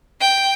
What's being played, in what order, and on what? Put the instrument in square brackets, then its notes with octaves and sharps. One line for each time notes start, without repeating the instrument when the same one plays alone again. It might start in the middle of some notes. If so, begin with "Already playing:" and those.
[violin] G5